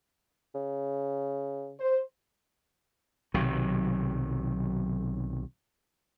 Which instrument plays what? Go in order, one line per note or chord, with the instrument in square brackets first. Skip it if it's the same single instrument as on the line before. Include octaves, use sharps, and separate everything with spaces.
[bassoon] C#3
[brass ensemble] C5
[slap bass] B1 C3 D#3 F#3